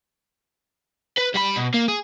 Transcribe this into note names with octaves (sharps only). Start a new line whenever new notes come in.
B4
G3 B5
B2
A#3
G#4